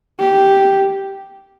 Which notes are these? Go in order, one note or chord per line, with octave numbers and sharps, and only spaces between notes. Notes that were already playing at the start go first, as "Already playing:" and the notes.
G4